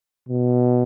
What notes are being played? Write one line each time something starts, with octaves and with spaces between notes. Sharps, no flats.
B2